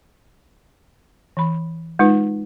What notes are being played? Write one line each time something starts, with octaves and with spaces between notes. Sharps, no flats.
E3 B5
G#3 D#4 F4 B4